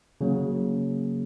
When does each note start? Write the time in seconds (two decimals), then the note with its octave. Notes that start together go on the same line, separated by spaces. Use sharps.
0.21 C#3 F#3 A#3